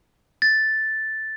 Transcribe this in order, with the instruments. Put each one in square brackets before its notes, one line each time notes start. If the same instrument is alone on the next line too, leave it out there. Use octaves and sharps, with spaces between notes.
[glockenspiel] A6